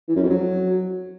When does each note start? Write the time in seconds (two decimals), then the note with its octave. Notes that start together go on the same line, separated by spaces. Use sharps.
0.09 E3
0.16 F#2
0.23 F2
0.30 F#3